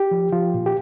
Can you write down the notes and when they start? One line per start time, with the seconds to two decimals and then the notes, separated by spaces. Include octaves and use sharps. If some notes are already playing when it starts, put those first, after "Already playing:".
Already playing: G4
0.11 F3
0.32 F3 F4
0.54 A#2
0.66 G4